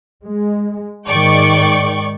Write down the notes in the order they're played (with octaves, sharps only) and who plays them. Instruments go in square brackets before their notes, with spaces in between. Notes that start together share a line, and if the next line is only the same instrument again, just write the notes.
[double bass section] G#3
[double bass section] G#2 D#3 G#3 [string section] D5 G5 C#6